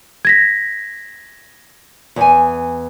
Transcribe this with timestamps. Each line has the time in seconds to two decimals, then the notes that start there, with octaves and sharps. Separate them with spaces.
0.25 G#6 A#6 B6
2.16 E2 G#5